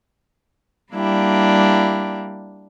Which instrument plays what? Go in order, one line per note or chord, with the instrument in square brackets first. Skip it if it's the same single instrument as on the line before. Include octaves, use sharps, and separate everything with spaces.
[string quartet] G3 A#3 D4 E4 G4